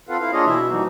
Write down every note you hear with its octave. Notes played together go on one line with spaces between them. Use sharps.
C4 F4 A4 B4 F5 F#5
E4 F5
A#3 D4 F4 G#4 C#5 D#5
B2 E3 E4 E5
E3 F3 G3 A#3 D#4 F#4